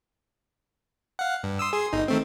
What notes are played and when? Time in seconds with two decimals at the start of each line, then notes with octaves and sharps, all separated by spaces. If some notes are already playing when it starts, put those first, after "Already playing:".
1.19 F5 F#5
1.43 G2
1.59 C6 D#6 E6
1.73 G#4 C6
1.93 G1 D#4
2.08 D#3 A3 C4